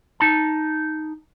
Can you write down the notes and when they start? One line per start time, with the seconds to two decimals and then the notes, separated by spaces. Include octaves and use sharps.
0.20 D#4 A5